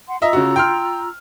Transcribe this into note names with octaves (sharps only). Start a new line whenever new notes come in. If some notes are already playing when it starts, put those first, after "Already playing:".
F#5 C6
F4 D#5 E5 A#5 E6
C#3 F#4
G5 C6 F6